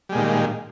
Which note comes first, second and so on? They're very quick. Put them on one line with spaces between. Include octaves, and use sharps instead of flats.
G3 G#3 A#2 D#3